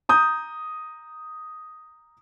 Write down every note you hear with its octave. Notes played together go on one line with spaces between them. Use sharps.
A#5 D#6 G6